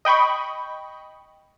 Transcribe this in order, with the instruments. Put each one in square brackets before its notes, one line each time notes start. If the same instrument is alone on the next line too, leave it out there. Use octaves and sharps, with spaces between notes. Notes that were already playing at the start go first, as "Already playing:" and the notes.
[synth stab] D#5 G5 B5 C#6